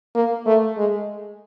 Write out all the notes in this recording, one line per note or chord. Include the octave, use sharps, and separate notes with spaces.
A#3
A3
G#3